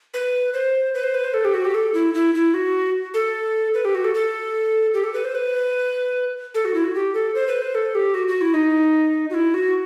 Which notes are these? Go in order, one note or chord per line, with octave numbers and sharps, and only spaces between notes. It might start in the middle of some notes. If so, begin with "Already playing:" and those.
B4
C5
B4
C5
B4
C5
A4
G4
F#4
G4
A4
E4
E4
E4
F#4
A4
B4
G4
F#4
A4
A4
G4
A4
B4
C5
B4
A4
F#4
E4
F#4
G4
A4
C5
B4
C5
A4
G4
F#4
F#4
E4
D#4
F#4
E4
F#4